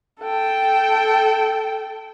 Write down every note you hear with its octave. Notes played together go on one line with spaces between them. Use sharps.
A4 G5